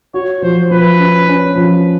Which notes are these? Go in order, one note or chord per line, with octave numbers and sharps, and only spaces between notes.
F#4 C#5
F3 C5
F3 B4
C#4
C#4
F3